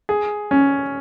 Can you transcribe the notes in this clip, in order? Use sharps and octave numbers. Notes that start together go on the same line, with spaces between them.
G#4
C#4